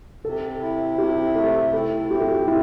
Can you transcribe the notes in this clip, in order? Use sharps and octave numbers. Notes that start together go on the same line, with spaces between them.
C3 A4
E4
C3 G4
A3 A4
E4 A4
C4 G4
A4
G4
A2 E4